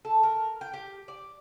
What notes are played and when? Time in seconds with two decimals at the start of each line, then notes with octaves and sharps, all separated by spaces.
0.05 A4
0.23 A#4
0.61 G5
0.74 G4
1.08 D5